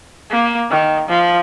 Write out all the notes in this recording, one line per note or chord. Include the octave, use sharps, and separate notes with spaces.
A#3
D#3
F3